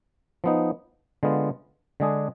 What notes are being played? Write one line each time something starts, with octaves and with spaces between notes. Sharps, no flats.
F3 B3 D#4
D3 G#3 B3 F4
D3 G#3 D4 G#4